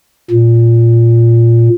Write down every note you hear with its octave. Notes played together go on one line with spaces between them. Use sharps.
A#2